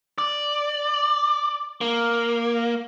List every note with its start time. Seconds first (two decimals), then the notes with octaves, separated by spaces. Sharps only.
0.18 D5
1.81 A#3